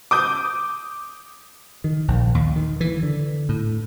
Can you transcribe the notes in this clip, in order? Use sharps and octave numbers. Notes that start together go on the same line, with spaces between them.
D6 D#6 G6
D#3
A#1
D#2
D#3
E3
D3
A2